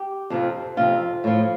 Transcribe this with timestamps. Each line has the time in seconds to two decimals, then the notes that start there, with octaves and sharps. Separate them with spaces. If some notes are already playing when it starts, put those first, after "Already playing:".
Already playing: G4
0.30 F2 C3 F3
0.77 F2 C3 F3 F4
1.24 A2 F3